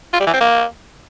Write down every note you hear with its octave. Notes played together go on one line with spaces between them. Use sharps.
F4
G3
E3
C4
A#3